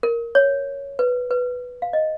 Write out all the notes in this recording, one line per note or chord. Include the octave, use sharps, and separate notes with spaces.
A#4
C#5
B4
B4
F5
D#5